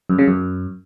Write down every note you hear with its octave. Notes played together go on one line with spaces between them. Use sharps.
F#2
C#3
F#2